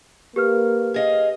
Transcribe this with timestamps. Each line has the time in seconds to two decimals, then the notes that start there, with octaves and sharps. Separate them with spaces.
0.36 A#3 G4 B4 F6
0.94 G#4 D#5 F5